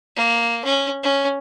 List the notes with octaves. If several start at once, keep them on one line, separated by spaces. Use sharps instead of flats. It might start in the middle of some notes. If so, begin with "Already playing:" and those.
A#3
C#4
C#4